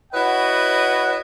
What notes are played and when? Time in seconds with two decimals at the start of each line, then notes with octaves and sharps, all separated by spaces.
0.13 E4 F#4 B4 C#5 D#5 F#5